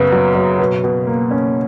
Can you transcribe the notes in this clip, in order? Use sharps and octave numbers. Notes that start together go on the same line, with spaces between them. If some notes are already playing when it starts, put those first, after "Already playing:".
Already playing: F#2 C#3 B3
F#3
F#3
B2
B2
A#3
C#4